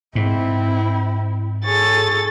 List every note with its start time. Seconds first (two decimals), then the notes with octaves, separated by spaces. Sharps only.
0.15 G#2 C4 E4
1.65 G#4 A4 C#5 A6